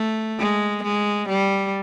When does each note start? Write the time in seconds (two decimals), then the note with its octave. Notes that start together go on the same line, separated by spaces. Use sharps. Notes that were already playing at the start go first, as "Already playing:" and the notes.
Already playing: A3
0.39 G#3
0.85 G#3
1.29 G3